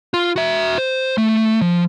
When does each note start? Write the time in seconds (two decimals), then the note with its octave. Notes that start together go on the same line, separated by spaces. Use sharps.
0.14 F4
0.36 F#4 E5
0.78 C5
1.18 A3
1.62 F3